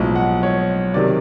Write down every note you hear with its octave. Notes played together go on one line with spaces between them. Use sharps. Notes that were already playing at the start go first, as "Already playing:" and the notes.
Already playing: B1 A2 F3 G#3
F#5
C#5
C3 D#3 F#3 D5